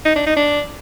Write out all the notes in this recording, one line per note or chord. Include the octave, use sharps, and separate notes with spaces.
D#4
D4
D#4
D4